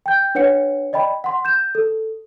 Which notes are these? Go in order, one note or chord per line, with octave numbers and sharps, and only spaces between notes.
G5 G6
D4 B4 C#5 F#5 C#7
D5 D#5 G5 B5
F#5 C6
G6 E7
A4